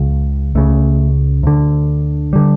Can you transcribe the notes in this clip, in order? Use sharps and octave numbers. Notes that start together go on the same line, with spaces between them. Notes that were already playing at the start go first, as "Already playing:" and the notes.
Already playing: C#2 C#3
C#2 C#3 A3
D2 D3
D3 G3